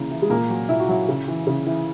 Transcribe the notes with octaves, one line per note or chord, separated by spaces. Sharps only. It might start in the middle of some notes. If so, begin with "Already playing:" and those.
Already playing: C#3 E3 A#3
E3
G#3
A#2 A#3
F#3
A#2 E4
F#4
F#3 E4
C#3
E3
C#3
E3